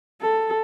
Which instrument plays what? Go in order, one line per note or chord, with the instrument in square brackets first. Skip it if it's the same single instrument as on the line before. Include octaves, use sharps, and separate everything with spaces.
[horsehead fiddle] A4